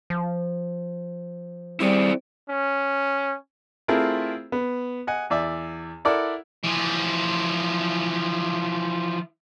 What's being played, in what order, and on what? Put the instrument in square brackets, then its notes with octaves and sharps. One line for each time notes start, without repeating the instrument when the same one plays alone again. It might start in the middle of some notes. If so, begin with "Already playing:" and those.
[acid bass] F3
[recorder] G3 [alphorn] C4 [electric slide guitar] E4 G#4 D5
[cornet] C#4
[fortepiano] A3 C4 E4 F4 G#4 A#4
B3
D#5 F#5 G#5
E2 D5 E5
E4 A4 A#4 D5 F#5 E6
[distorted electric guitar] E3 F3